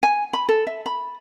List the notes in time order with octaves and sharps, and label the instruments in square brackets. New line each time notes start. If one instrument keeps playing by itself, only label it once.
[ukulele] G#5
B5
A4
E5
B5